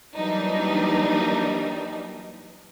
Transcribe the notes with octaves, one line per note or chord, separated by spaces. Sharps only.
E3 F#3 G3 A#3 D4 D#4